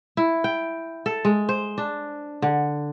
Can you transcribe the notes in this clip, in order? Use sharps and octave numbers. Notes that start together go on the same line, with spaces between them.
E4
G5
A4
G#3
C5
D4
D3